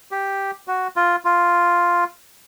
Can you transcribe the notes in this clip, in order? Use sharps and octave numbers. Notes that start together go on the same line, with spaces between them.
G4
F#4
F4
F4